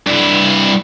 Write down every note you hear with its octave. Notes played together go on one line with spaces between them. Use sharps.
G2 E4